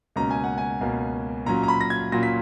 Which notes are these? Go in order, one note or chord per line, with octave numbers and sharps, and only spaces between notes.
C#2 B2 A#3 C#4 A#5
G#5
F#5
G#5
C#2 B2 A#3 C#4
A#2 F#3 C#4 F4 A#5
A#5
B5
A#6
G#6
A#2 F#3 C#4 F4 A#6
B6